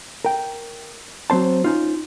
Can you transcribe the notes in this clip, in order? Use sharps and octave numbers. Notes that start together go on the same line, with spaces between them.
A#4 G5
F#3 C4 C5 A5
C#4 D#4 F4